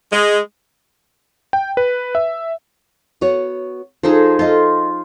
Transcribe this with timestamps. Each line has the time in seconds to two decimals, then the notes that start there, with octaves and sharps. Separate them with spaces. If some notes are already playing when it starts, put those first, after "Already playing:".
0.12 G#3
1.53 G5
1.77 B4
2.15 E5
3.21 B3 F#4 C#5
4.03 F3 D#4 G#4 A4
4.39 F4 A4 D#5